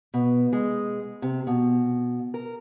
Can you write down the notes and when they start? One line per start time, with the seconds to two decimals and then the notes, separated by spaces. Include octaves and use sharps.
0.14 B2
0.53 G#3
1.22 C3
1.47 B2
2.34 A#4